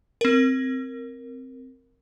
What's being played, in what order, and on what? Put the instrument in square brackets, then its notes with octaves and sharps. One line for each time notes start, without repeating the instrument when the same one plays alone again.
[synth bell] C4 A#4